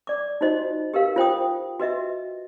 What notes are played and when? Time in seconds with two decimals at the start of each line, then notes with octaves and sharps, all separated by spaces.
0.07 D5 D6
0.41 D#4 F4 F#4 C5 D#5
0.94 G4 A#4 B4 F5
1.16 F4 C5 G5 D#6
1.80 F#4 B4 D#5 E5